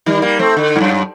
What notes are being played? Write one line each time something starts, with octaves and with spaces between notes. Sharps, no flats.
D#3 G3
G3 A#3
A3 C4
D3
G2
F#2